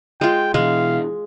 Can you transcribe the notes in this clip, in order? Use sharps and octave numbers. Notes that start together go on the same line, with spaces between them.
G#3 F4 G5
B2 E3 G#3 F5